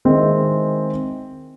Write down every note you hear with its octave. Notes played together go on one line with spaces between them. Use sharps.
D#3 G#3 C4 E4 G#4